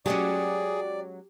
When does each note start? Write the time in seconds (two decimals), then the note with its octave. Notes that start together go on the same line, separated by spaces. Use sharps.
0.06 F#3 G#3 C#4 G4 G#4 D5